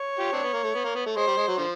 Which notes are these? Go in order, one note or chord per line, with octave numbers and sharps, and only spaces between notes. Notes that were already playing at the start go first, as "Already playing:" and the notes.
Already playing: C#5
F4 G4
C4 D4
B3
A#3
A3
B3
A#3
B3
A3
G#3 C5
G3
G#3
F#3
D3 F3